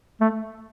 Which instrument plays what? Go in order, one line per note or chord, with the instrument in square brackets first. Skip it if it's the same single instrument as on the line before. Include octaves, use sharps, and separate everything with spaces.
[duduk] A3